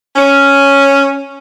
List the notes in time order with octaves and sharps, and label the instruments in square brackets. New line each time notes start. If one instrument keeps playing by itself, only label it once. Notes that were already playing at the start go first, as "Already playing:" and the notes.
[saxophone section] C#4